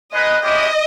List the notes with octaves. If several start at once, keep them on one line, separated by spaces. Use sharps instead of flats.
G#3 D#4 G#4 B4 D#5
G#3 C#4 E4 G4 D#5